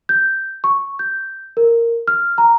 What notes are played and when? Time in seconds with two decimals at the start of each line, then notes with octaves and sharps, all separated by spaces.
0.09 G6
0.64 C#6
0.99 G6
1.57 A#4
2.08 F6
2.38 A#5